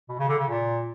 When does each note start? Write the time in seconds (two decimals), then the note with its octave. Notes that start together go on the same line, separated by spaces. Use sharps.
0.09 B2
0.19 C#3
0.29 D3
0.39 C#3
0.49 A#2